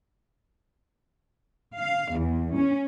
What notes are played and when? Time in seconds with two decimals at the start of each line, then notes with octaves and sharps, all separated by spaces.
1.77 F5
2.17 E2
2.56 C#4